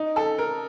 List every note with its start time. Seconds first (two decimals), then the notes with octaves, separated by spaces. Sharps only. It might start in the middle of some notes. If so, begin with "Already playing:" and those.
Already playing: D#4
0.16 A4
0.38 A#4